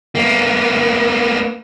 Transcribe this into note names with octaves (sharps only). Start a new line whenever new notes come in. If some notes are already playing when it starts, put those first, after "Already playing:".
A#3 B3